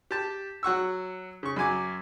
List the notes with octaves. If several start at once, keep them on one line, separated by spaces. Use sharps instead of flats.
G4 A5
F#3 F#5 C#6 E6
C#3 C#6
F#2 F#3 G#5 D6